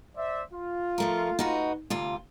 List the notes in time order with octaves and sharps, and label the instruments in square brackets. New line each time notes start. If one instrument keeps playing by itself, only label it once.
[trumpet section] C5 D5 E5
F4
[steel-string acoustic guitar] F3 A3 A#4
D#4 F#4 B4
D2 C3 F4